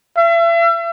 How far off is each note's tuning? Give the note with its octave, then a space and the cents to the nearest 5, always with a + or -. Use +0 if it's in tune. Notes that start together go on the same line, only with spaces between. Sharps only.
E5 +40